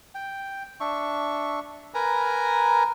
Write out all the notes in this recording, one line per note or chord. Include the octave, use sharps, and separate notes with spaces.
G5
D4 E5 C#6
A#4 B4 G#5 A#5